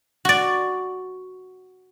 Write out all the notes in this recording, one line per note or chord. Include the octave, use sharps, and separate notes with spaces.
F#4 D5